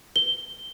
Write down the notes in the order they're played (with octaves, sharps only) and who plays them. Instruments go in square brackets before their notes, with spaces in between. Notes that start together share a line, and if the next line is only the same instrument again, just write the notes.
[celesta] G7